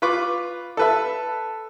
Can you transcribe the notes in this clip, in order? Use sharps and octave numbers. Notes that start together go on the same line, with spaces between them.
F4 B4 B5 C#6 D6
A4 B4 E5